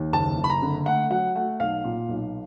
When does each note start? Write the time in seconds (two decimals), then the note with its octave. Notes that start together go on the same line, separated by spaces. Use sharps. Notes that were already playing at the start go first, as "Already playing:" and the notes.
Already playing: D#2
0.13 F#1 A5
0.37 F#1
0.44 B5
0.50 A#5
0.62 D3
0.86 A3 F#5
1.10 F#3 F#5
1.35 A3 F#5
1.60 B1 F5
1.84 A#2
2.09 B1